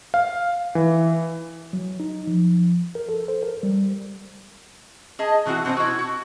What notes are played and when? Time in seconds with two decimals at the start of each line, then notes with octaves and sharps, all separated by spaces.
0.14 F5
0.75 E3
1.73 F#3
2.00 D#4
2.27 F3
2.95 A#4
3.09 A4
3.28 C5
3.43 A#4
3.63 G3
5.19 G#4 D#5 A5
5.46 B2 E3 C4 E4 F#4
5.65 B2 C4 D4 C5 D#5
5.77 E4 F#4
5.99 F#4